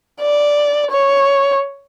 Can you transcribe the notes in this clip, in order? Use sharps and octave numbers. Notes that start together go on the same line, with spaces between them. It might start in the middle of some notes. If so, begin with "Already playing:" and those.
D5
C#5